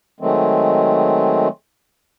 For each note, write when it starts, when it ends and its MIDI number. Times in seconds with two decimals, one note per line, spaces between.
0.20 1.48 51
0.20 1.48 54
0.20 1.48 56
0.20 1.48 57
0.20 1.48 60